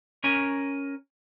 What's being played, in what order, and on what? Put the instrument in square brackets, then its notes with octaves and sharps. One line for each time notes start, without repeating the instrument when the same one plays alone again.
[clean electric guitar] C#4 A#4 G#5